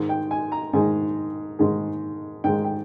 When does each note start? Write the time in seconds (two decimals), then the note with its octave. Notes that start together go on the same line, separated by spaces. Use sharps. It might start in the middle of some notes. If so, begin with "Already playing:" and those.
Already playing: G#2 D#3 G#3
0.09 G5
0.31 G#5
0.52 A#5
0.73 G#2 D#3 G#3 G#5
1.59 G#2 D#3 G#3
2.44 G#2 D#3 G#3 G5
2.64 G5